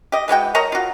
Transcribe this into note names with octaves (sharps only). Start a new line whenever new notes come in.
G4 D#5
E3 G#3 F#4 G5
A#4 C#5 D#5 A#5
F4 F#4